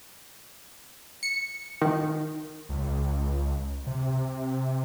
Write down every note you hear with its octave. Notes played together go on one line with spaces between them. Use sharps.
C#7
D#3
C#2
C3